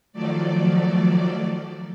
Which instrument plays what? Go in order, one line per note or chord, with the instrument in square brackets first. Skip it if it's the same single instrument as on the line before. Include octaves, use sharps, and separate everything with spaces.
[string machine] D#3 F3 F#3 A3 D5